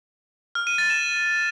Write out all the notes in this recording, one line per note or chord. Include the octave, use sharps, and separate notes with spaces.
F6
D#7
A6
E7